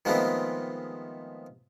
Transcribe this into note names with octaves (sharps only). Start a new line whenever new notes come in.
D#3 F3 G#3 A3 B3 C4